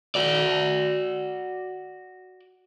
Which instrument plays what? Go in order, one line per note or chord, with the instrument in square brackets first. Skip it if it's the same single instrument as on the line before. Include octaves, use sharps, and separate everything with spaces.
[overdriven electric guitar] F#4 D5